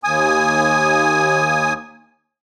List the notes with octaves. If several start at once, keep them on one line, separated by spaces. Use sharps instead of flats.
D#2 G#5 D#6